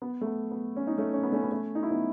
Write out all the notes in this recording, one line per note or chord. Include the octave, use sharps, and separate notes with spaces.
B3
A3
B3
B3
C#4
D#4
A3 C#4
C#4
B3
A3 C#4
B3
A3 C#4
D#4
E4
B3 D#4